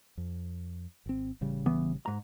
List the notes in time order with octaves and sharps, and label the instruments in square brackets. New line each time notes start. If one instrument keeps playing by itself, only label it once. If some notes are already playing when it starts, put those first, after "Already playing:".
[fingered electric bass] F2
G#1 C4
A1 C#3 G3
[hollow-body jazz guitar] E3 B3
G#2 A#5